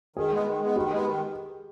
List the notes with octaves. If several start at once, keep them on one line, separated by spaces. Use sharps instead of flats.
D#3 G#4
G#3 B3
D#3
G#3 B3
D#3 G4
G#3 B3
D#3